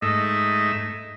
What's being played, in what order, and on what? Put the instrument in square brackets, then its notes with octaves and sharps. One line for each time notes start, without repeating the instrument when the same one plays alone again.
[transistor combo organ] G#2 A3 E5 [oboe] D#5